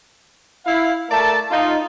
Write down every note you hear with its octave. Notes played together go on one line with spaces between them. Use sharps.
E4 F5
A3 A#4 D5 A5
D#4 F4